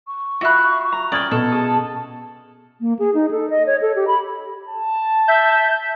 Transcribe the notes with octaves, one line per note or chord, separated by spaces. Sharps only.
C#6
F4 F#4 E5 B5 F#6
A#5
C#4 D5 G5 D#6 F6 G#6
B2 A4 A5
G#4 A5 D#6
A#3
G#4
D#4
A4
D#5
C#5
A4
G4
B5
A5
E5 G6